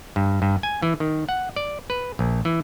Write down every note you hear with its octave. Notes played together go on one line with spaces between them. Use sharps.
G2
G2
G#5
E3
D#3
F#5
D5
B4
A#1
E3